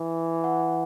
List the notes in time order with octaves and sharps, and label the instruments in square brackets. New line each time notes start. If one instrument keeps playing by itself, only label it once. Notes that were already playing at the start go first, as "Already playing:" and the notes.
Already playing: [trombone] E3
[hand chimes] F#5